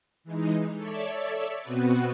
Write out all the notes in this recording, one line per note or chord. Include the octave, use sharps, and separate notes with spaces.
E3 G#3 D#4
A4 C#5 D5 E5
B2 B3 C4 F#4 B4